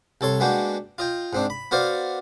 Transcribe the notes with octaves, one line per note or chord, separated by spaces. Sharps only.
C2 A4 C#5 C6
G#3 A#3 B3 D4 F#4 G5
F4 D#5 G5
G#2 C4 D4
B5
B3 F#4 A#4 C5 D5 F5